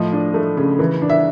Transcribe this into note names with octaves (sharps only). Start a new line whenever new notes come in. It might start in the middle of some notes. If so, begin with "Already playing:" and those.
Already playing: A2 F3 D#5
D4
A3
C#3
E3
D4
E5